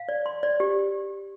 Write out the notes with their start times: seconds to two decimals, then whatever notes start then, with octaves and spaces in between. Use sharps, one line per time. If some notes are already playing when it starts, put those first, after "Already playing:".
Already playing: F5
0.09 D5
0.26 C6
0.43 D5
0.60 G4